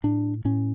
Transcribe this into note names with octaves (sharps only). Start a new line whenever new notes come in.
A2 D4
A2 C#4